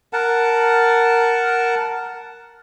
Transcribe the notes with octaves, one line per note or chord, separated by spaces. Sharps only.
A#4 F#5 A5